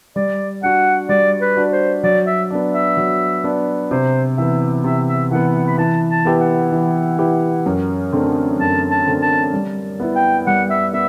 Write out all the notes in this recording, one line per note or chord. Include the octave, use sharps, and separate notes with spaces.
G3 D5
D4 F#4 F#5
G3 D5
B4
D4 F#4
C5
F#3 D5
E5
B3 D4
E5
F#3
B3 D4
C3 C5
E3 B3 E5
C3 E5
E5
E3 B3 F#5
F#5
B5
E3 A5
A5
B3 E4 G4 B4
F#5
E3
B3 E4 G4 B4
F#2
D3 A3 C4
F#2 A5
A5
D3 A3 C4
A5
G3
B3 E4 B4
G5
G3 F#5
E5
B3 E5